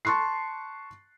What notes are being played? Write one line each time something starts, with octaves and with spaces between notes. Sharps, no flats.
A5 C6 C#6 F#6 C7